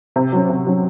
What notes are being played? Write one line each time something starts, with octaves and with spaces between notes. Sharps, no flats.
C3
F#3 C#4
C3
F#3 C#4